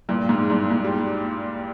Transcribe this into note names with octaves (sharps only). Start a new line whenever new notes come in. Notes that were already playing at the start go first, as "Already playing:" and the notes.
G2 A#2
G#2
G2
G#2
G3